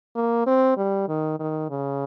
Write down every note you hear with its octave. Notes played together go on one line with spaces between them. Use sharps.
A#3
C4
G3
D#3
D#3
C#3